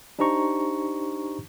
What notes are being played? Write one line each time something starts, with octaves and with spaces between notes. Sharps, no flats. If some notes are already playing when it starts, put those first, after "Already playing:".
D4 D#4 G4 C5 A#5 C#6